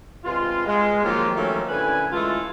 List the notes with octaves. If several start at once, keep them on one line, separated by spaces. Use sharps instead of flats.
G2 C3 G#3 F4
G#3
D#3 F3 F#3 A#3 F4 G4
D#3 F3 F#3 A3 A#3 C#4
D3 C#4 E4 B4 G#5
E3 G#3 A3 F4 A4